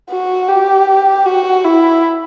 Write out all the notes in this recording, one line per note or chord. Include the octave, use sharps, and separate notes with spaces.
F#4
G4
F#4
E4